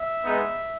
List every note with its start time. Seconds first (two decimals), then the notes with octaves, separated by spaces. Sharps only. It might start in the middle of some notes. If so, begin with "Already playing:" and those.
Already playing: E5
0.24 G#3 B3 D#4